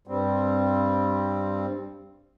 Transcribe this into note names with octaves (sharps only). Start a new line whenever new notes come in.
G2 G3 C4